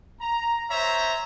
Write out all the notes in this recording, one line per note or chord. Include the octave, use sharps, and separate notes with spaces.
A#5
C5 C#5 E5 A#5